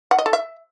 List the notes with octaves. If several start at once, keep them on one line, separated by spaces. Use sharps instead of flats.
F#5
D#5
A4
E5